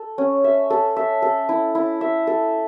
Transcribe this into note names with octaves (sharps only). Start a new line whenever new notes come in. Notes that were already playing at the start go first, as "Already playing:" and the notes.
Already playing: A4
C#4
E5
A4
E5
A4
E4
E4
E5
A4